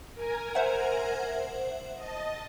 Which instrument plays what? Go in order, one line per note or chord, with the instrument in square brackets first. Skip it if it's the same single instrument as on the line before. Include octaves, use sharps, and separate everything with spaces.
[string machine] A#4 G#5 A#5
[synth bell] C5 E5 F#5
[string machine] D#5 A5